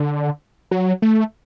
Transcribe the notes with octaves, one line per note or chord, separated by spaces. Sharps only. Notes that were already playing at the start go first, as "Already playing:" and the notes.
Already playing: D3
F#3
A3